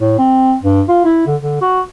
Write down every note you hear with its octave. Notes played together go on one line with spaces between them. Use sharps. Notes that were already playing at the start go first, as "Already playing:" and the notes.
A2
C4
G2
F4
E4
D3
D3
F#4